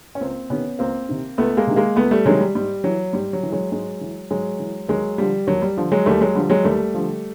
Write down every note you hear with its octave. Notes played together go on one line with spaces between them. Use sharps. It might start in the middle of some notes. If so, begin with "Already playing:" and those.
C#4
C#2 A#3 C4
C3 D#3 B3 C#4
C#2 A#3 C4
C3 D#3
C#2 A3 B3
G#3 A#3
C3 D#3
G#3 A#3
C#2 A3 B3
G3 A3
C3 D#3 F#3 G#3
G3
G#2 G3
E3 F#3
G#2 G3
F#3
E3
F#3 G#3
G#2 F#3 G#3
E3
G#2 F#3 G#3
E3
D#2 F#3 G#3
D3 F3 G3
D#2 F#3
G3
D3 F3
F#3 G#3
D#2 G3 A3
F#3 G#3
D3 F3 G3
F#3 G#3
D#2 G3 A3
D3 F3